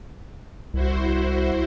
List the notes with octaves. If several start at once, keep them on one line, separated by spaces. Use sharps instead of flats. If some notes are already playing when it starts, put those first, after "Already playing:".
C2 E4 F#4 C5